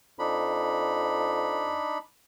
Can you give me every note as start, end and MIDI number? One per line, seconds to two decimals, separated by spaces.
0.19 1.81 41
0.19 1.98 62
0.19 1.98 63
0.19 1.98 83